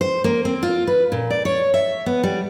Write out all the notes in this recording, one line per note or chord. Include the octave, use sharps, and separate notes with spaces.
C5
A#3
C4
F4
B4
A#2
D5
C#5
E5
B3
G3